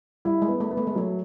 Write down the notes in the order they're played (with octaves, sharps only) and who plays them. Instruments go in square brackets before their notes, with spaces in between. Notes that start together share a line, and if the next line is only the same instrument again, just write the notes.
[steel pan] G3 [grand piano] E4
[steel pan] G#3
[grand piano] B3
[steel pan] A3
[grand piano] B3
[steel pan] A3
G#3
[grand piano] F#3 [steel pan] A3